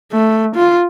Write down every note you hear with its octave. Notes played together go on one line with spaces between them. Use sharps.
A3
F4